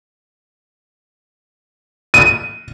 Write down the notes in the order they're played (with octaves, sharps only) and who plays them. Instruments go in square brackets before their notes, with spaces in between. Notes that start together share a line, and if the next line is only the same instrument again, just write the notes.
[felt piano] D#7